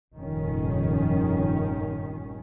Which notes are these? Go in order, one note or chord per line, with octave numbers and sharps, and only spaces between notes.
F1 A#1 G2 D#3 C#4